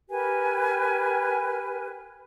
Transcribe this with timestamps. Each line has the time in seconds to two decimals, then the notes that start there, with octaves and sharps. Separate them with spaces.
0.10 G4 A#4 B4 G#5